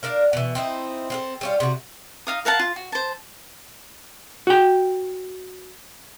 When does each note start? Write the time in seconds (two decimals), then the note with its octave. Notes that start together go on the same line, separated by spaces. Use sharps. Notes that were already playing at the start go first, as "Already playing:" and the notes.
0.03 D4 A#4 F5
0.33 B2 E3
0.55 C4 D#4 E4
1.10 C4 F4 A4
1.41 G3 C#4 F4
1.60 C3 F#4
2.27 D#4 F5 D#6
2.45 A#4 F5 F#5 A5
2.60 F4
2.76 F#4
2.92 C5 A5
4.47 F#4 G5